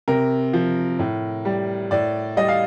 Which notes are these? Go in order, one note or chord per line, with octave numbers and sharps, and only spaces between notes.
C3 A#4
F3
A2
G3
A2 D5
G3 D#5
F5